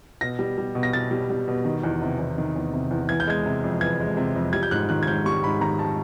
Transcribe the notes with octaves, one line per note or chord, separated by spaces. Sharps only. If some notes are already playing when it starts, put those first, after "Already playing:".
B2 A#6
G3
G3
B2
A#6
B2 A6
G3
G3
B2
D#3
E2
C3
E2
D#3
E2
C3
E2
E3 G#6
G6
G#3 G#6
C3
F2
E3 G#6
G#3
C3
F2
G3 G#6
G6
G#2 F#6
D#3 F#6
G#6
G#2 G6
G3 C#6
G#2 B5
D#3 A#5
A5